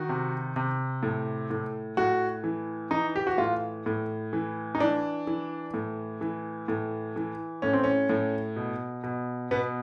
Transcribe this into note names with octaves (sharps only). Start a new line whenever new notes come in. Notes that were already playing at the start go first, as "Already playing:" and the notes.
Already playing: D#3 F#4
C3
C3
A2
A2
A2 F#4
E3
E3 D#4
G4
F#4
A2 F4
A2
E3
D#4
E3 D4
E3
A2
E3
A2
E3
A2 C#4
C4
C#4
A2
B2
B2
B2 B3